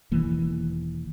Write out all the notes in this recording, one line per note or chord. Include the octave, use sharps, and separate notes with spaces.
E1 D#3 E3 A#3